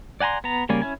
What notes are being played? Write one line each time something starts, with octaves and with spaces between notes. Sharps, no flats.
D5 F#5 G#5 A#5 C6
B3 A#5
C#3 G3 A#3 D5 G#5
C#4 E4 G#5